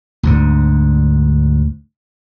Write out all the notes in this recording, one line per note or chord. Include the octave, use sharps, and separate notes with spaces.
D2 G#2 D3